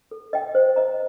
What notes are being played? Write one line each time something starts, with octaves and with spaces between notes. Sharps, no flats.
A4
D#5 G5
C5
D#5 A#5